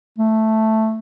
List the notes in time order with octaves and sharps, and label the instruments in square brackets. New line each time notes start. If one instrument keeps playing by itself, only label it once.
[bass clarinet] A3